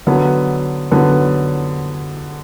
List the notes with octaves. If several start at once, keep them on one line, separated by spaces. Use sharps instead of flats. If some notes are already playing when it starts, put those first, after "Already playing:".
D3 F#3 B3
D3 F#3 B3